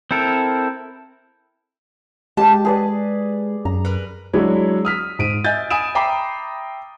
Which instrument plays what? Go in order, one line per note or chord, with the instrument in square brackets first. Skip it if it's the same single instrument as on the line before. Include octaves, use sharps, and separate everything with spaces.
[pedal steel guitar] C4 E4 A4 A#4
[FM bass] G#3 [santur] G4 D#5 G5 [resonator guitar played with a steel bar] A5
[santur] G#4 B4 D5
[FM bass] F#2 [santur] A#5
[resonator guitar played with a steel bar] A#4 B4
[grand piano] F#3 G#3 D4 E4 C#5
D#6 F6 B6
G#2 D7 D#7
D#5 E5 G#5 G6 A6
G#5 B5 D#6 D7 E7
E5 G5 A#5 B5 D6 C7